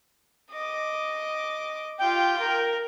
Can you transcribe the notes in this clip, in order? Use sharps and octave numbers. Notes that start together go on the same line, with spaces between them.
D#5 D6
F4 G4 G5
A#4